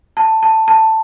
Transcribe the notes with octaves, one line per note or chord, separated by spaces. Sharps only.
A5
A5
A5